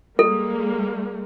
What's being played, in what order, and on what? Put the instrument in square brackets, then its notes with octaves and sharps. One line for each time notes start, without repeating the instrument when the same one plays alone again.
[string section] G3 G#3 A#3 [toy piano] A4